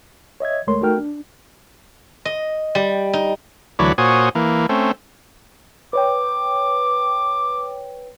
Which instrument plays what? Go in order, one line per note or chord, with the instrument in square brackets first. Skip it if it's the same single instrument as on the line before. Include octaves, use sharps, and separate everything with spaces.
[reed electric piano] C#5 D#5 E5 G#6
D2 G#3 A3 A#4 C#5 C6
A3 D#4 F#4 A#4 G5 F6
D4
[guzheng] D#5
G3
D#4
[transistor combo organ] D2 E3 F#3 C#5 D5 B5
A#2 F#4 C5 C#5 G#5 D#6
E3 A#3
A3 C4 C#4
[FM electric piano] B4 C#5 G5 [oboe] D6